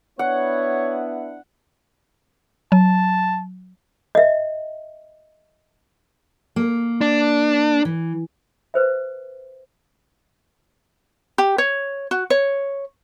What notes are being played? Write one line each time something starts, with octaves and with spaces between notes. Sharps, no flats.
B3 D4 E4 C#5 F#5
F#3 A5
D#5 E5
A#3
D4
E3
B4 C5 E5
G4
C#5
F#4
C#5